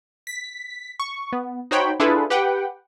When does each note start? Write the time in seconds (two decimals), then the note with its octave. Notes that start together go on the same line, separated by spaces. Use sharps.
0.27 B6
1.00 C#6
1.33 B3
1.71 D#4 F#4 C5 C#5 G5 B5
2.00 D4 E4 F4 G#4 A4 B4
2.30 G4 B4 F#5 G5